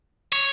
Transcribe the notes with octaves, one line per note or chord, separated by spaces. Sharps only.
C#5